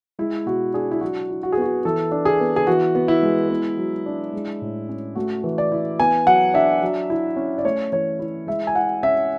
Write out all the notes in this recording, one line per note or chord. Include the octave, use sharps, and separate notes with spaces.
G#3 E4
B2 F#4
D4 G#4
E4
F#3 F#4
E4
F#4
G#4
B3 F#4
E3 A4
D4
G#4
B3
G#4
E3 F#4
B3
E4
G#3
B3
F#3
D4
G#3
A2
C#4
A3 F#4
E3
D5
E4
B3 G#5
F#3 F#5
D4 E5
F#3
E4
C#4
D5
A3 C#5
E3 C#5
E4
G#3 E5
G#5
E4 F#5
C#4 E5